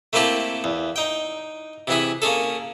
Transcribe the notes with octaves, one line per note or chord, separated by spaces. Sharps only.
A3 A#3 C4 E4 G4 A4
E2
D#4 G5
C3 E3 E4 G#4
A#3 C#4 G#4 A4